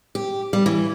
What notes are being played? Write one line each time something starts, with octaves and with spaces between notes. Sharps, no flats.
G4
G3
E3